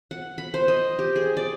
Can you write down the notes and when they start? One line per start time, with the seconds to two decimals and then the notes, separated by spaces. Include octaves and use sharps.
0.11 F#5
0.38 B5
0.54 C5
0.68 D#5
0.99 G4
1.16 G#4
1.37 D5